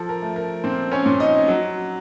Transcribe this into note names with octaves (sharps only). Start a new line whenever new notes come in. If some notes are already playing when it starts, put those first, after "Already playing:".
Already playing: F3 A4
A#4
A3
A#4
A#2 C4 C5
C#4 C#5
A#2
D#4 D#5
F#3